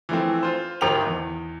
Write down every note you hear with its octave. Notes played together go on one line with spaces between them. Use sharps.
E3 F3 A3 C4
F4 C5
D1 G#1 D#3 G4 A#4 F7
E2